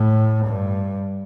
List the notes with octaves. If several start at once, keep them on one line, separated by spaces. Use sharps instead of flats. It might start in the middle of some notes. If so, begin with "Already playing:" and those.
Already playing: A2
G2